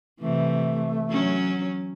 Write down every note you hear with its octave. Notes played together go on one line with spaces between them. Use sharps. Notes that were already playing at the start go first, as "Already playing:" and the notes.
C3 E3 A3
F#3 C#4